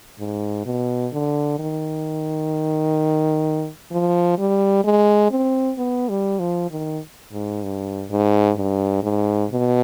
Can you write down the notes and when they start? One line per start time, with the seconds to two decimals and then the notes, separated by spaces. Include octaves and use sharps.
0.19 G#2
0.65 B2
1.13 D3
1.59 D#3
3.92 F3
4.38 G3
4.84 G#3
5.31 C4
5.78 B3
6.09 G3
6.39 F3
6.71 D#3
7.32 G#2
7.63 G2
8.10 G#2
8.57 G2
9.03 G#2
9.50 B2